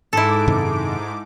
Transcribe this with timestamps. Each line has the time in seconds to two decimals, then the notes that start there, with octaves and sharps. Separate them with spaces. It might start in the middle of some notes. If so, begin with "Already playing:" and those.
0.13 G#2 E4 A4 D6
0.48 F#2 C3 D#3